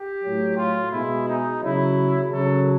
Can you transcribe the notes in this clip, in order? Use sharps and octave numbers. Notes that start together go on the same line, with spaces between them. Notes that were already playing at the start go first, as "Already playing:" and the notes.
Already playing: G4
A2 F#3
F4
B2 G#3 E4
D#4
C#3 F#3 E4
C#3 F#3 A4